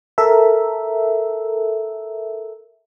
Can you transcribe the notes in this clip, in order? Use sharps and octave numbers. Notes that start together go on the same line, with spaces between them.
A4 A#4 E5